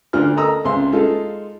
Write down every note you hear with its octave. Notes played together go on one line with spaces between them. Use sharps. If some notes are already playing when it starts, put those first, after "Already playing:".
D2 D4 F4 F6
A4 A#4 D#5 A#5 D#6 E6
C#2 C4 E5 C6
G#3 D#4 F4 A4